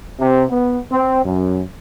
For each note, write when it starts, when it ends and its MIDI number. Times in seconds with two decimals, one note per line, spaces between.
0.19 0.44 48
0.49 0.77 59
0.90 1.19 60
1.24 1.60 42